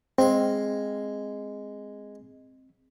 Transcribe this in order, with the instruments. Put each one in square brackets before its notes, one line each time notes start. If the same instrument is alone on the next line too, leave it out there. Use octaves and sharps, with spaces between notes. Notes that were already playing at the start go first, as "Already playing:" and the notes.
[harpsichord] G#3 F5 [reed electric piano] C4